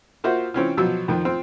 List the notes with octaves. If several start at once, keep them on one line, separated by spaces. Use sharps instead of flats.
A#3 F4 F#4 C5 E5
E3 C4 C#4 F4
B2 F3 F#3 E6
F2 D#3 F3
C4 F4